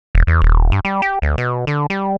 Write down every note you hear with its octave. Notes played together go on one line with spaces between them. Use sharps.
E1
E2
D#1
G2
G3
G4
D2
B2
D3
G3